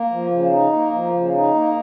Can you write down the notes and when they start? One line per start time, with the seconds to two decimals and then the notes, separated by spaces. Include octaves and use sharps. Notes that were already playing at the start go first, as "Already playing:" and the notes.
Already playing: A#3
0.11 F3
0.30 C#3
0.52 D#4
0.73 A#3
0.93 F3
1.14 C#3
1.34 D#4
1.54 A#3